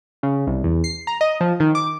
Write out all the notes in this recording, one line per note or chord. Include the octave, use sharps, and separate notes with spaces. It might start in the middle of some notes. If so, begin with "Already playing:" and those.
C#3
C2
E2
C7
A#5
D#5
F3
D#3
D6